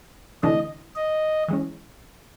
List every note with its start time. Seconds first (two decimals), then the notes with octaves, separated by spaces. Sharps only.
0.43 D2 C3 E3 A3 D4 D#5
0.96 D#5
1.48 E3 G#3 C#4